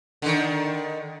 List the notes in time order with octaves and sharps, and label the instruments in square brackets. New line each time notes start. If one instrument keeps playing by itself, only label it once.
[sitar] D3 D#3